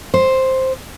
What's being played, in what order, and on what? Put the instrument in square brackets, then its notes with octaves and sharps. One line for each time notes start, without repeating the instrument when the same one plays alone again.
[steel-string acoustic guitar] C5